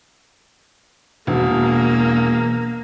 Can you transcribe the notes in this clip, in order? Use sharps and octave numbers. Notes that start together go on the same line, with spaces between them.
E1 A#3